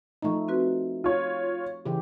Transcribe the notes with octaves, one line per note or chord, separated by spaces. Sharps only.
F3 A3 D#4 A#5 C#6
C4 F#4 B4
F4 C#5
C#3 E3 G4